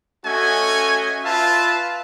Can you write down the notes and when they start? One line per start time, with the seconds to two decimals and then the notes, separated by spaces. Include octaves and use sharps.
0.25 A3 C#4 F#4 D#5 G#5
1.24 F4 B4 E5 A5